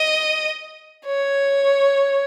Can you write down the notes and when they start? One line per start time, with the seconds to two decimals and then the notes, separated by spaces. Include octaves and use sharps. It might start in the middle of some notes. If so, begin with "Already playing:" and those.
Already playing: D#5
1.06 C#5